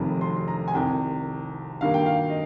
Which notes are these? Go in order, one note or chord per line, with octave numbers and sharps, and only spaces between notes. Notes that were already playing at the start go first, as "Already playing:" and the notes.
Already playing: F1 F2 C3 D#3 G3
C6
C6
A#5
G#5
C2 C3 D#3 G5
G2 D#3 A#3 F5
G5
F5
D#5